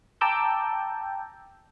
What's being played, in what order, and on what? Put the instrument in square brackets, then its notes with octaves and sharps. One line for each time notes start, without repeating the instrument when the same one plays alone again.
[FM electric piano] G5 A5 A#5 D6 E6 G6